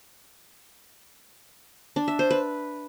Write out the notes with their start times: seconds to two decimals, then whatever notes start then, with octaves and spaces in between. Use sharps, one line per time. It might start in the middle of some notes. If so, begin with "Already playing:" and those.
1.96 D4
2.08 E5
2.19 C5
2.31 B4